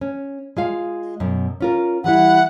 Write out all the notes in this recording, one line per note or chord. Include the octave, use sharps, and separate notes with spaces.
C#4
G#3 F4 F5
F#2 B2
C#4 F4 A#4
E3 G3 E4 F#5